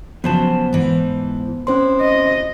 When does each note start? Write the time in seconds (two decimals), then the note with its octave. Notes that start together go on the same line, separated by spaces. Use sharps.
0.24 C#3 F3 F#3 B3 C5 A5
0.73 G#2 E3
1.67 C4 C#4 E4 C5 C6
2.01 D#5